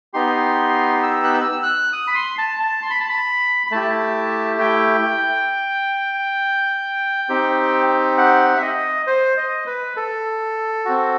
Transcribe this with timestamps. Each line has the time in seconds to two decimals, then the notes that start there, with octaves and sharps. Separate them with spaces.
0.14 B3 D#4 G4 C6
1.03 E6
1.24 F#6
1.34 E6
1.52 E6
1.63 F#6
1.93 D#6
2.07 B5
2.15 C6
2.38 A5
2.60 A5
2.82 C6
2.90 B5
3.00 A5
3.09 B5
3.67 B5
3.71 A3 E4 G4 A5
4.60 G5
7.29 C4 D#4 G4
8.18 F#5
8.57 E5
8.62 D#5
9.07 C5
9.37 D#5
9.67 B4
9.96 A4
10.85 C4 F#4